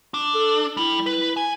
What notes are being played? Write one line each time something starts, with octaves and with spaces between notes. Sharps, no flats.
D4
A4
G3 E4
B4
G#5